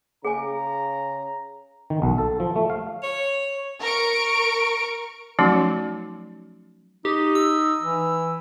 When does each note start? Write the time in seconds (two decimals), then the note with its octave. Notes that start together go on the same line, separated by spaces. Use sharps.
0.25 C#3 G#4 G#5 A#5
1.90 D#3
2.02 B1
2.18 A4
2.40 F3
2.56 A3
2.70 F5
3.03 C#5
3.80 A#4 C#6 D7
5.39 F3 F#3 A3 C#4 D#4 F#4
7.05 D#4 G4
7.35 E6
7.81 E3